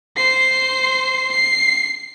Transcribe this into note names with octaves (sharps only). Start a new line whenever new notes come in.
C5 C7
C7